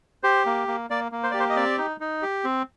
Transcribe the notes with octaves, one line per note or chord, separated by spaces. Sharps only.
G4 C5
A#3
A#3
A#3 D5
A#3
C5
G4 D5
C5
D#5
C4 D5
D#4
D#4
G4
C4